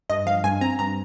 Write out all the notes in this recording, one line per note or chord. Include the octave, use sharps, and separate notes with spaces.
G2 D#5
F3 F5
G2 G#5
C4 A#5
G2 A#5